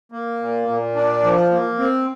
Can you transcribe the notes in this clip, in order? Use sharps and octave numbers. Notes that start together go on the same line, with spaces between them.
A#3
A#2
A#2
D4
F3
A#3
C4